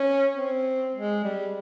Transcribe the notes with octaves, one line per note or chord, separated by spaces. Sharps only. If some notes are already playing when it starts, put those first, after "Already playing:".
Already playing: C#4
C4
G#3
G3